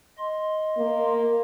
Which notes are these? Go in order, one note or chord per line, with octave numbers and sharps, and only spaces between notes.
D#5 C6
A#3